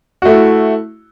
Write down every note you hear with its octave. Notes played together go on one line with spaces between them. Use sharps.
A3 E4 F#4